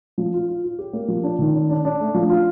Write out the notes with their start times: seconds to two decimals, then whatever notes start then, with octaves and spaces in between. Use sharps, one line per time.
0.18 F3
0.34 F4
0.48 F4
0.64 F4
0.79 G4
0.93 A#3
1.08 F3
1.23 D4
1.39 D#3
1.54 D4
1.70 D4
1.85 D4
2.00 A3
2.14 F3
2.30 F4